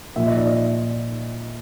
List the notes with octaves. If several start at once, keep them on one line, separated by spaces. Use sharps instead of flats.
A#2 F3 E5
D#5
D5
D#5